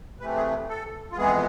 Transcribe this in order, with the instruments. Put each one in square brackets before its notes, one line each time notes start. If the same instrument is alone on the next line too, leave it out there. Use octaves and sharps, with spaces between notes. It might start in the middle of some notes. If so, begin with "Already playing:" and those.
[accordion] C3 E3 A3 B4
G#4
A4
F4
F2 E3 G#3 B3 G#4